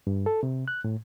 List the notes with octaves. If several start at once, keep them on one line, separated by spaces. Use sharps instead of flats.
G2
A4
C3
F#6
A2